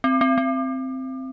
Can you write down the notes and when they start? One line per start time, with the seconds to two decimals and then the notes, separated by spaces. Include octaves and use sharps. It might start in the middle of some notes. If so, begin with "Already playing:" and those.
0.04 C4
0.21 C4
0.38 C4